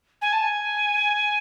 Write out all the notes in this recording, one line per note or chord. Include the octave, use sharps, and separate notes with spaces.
G#5
A5
G#5